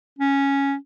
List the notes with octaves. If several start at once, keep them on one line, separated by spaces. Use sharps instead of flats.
C#4